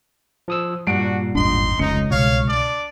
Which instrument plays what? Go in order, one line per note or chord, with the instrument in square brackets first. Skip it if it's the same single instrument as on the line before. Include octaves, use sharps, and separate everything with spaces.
[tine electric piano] F3 D#6 E6
[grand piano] G2 D7 [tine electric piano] A#2 F#5 C7 [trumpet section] D4 F#4
[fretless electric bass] G#1 E2 D4 [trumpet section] D#4 C6
[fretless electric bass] F1 C#4 [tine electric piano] C#2 [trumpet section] D#4 [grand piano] C#7
[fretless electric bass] C2 B2 [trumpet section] C#5 F5
[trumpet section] D4 D5